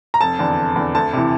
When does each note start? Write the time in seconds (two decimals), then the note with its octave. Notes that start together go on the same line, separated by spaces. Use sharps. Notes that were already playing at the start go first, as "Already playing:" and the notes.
0.14 A#5
0.21 F1 A5
0.39 E2 D3
0.57 F1
0.76 E2 D3
0.95 D2 A5
1.13 C3 E3